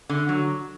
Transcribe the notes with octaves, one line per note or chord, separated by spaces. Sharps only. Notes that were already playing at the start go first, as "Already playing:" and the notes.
D3
F#3